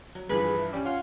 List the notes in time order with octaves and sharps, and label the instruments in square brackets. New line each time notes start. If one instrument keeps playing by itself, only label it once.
[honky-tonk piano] F#3
[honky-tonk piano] G2 E3 F3 [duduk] G#4 [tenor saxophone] B4
[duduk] G#4
E4
[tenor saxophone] G3 [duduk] C#4
[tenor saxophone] F4 [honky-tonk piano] C#5 F#5 G#5